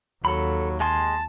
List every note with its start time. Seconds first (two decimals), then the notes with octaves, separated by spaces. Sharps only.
0.25 D#2 F#3 A4 B5
0.80 G#3 G#5 A5 C6